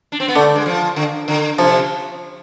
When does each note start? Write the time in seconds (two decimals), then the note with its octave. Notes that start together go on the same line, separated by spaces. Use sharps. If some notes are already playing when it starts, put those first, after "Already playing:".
0.12 D4
0.20 C4
0.28 B3
0.35 D3 A3
0.56 G#3
0.66 F3
0.96 D3
1.28 D3
1.58 C3 F3